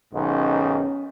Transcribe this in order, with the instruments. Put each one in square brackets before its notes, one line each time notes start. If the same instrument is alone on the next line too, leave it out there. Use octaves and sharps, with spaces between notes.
[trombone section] B1 G#2 D#3 [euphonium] C#4